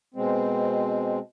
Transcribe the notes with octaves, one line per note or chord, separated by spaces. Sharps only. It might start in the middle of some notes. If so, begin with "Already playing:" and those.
B2 G#3 C4